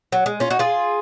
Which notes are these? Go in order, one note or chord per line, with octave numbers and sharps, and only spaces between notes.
F#3
G#3
C#4 F4
D#4 F#4
F4 G#4